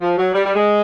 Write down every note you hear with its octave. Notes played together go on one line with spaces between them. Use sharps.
F3
F#3
G3
G3
G#3